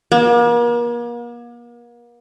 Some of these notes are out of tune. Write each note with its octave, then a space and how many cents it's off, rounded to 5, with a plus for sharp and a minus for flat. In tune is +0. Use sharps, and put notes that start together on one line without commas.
A#3 +40